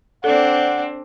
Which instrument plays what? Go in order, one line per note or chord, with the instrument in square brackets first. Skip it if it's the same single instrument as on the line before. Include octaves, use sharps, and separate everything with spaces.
[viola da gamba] C4 D4 [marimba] A4 [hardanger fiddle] D5 [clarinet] F#5